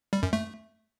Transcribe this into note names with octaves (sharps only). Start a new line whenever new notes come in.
G3
F#2
A3